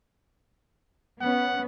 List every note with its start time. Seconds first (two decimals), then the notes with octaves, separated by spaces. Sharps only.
1.21 B3 C#4 F#5